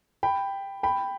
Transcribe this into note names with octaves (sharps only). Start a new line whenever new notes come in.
G5 B5
G5 B5